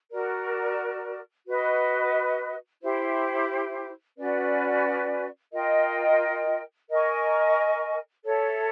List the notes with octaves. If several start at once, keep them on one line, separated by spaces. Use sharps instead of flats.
F#4 A#4 D5
F#4 B4 D#5
E4 G4 C5
C#4 F#4 B4 D5
F4 A#4 D#5 G5
A#4 D#5 G#5 C#6
A4 C#5 E5